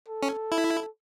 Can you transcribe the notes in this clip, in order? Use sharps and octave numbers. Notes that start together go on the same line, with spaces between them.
A4
C#4
E4